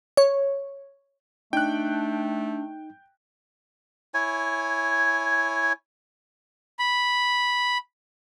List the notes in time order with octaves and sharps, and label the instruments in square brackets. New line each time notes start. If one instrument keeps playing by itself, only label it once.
[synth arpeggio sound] C#5
[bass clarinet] A3 [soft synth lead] D4 [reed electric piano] D#4 [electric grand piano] G5 F#6
[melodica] E4 C#5 G#5
[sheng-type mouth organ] B5